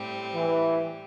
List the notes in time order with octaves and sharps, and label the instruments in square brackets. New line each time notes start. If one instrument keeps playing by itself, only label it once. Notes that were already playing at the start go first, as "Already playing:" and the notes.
Already playing: [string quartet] A2 G3 C4
[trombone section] E3